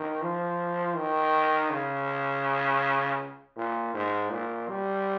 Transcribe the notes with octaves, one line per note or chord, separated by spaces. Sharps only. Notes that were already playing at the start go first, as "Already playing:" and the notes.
Already playing: D#3
F3
D#3
C#3
A#2
G#2
A#2
G3